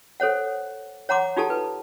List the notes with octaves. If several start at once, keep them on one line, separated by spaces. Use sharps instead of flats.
A4 C5 C#5 F#5
C#5 F#5 A#5 C6 D6
D#4 F4 G4 A4 A5
B4